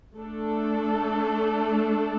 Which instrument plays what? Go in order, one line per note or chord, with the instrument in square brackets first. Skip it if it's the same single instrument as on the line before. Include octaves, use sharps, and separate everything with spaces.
[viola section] A3 D4 A4